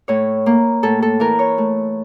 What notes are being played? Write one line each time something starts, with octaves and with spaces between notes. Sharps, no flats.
A2 C#5
A#3
A2 A4
A4
E3 A#4
C#5
A3